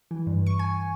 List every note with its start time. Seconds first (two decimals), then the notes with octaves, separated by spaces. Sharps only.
0.11 E3
0.27 G2
0.46 C#6
0.59 G#5